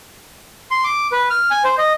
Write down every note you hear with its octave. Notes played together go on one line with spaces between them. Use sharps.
C6
D6
B4
F6
G#5
C5
D#5